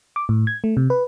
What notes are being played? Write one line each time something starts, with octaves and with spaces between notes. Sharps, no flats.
D6
A2
G#6
A3
C3
B4